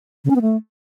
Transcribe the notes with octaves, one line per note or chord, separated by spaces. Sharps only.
C#3
C#4
B3
A3